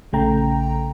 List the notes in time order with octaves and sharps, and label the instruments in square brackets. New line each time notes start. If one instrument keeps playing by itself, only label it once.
[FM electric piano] A#1 C#3 A3 G5 A#5